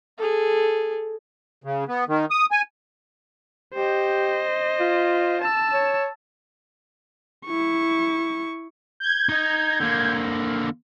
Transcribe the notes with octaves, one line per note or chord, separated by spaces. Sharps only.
G#4 A4
C#3
B3
D#3
D#6
G#5
G4 C5 D#5
F4
A5 E6
C#5
E4 C#6
G6 G#6
D#4 D#5
D3 A#3